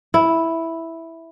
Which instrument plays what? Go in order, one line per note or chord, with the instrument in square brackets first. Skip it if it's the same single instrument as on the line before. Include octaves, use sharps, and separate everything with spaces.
[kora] E4